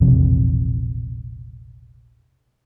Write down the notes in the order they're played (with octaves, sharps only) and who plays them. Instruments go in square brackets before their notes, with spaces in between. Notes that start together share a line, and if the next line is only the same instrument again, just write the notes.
[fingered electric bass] E1 A#1 C3 E3